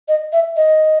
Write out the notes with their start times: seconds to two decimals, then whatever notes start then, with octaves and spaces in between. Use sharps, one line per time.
0.08 D#5
0.33 E5
0.57 D#5